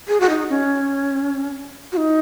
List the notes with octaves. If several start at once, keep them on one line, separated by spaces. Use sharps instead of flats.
G#4
F#4
D#4
C#4
F#4
D#4